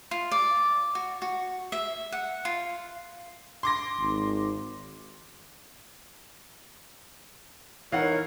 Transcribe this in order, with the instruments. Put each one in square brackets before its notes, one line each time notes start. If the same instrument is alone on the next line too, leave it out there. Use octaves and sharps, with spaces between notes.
[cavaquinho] F4
D5
F#4
F#4
E5
F#5
F4
[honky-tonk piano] C6 D6 A#6
[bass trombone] G#1
[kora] E3 [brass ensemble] D#4 A#4 C#5 [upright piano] F5 F#5